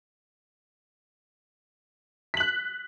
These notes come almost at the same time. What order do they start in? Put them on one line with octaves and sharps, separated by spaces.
B6 F#7 F#6